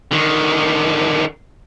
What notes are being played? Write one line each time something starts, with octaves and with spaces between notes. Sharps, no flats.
D3 D#3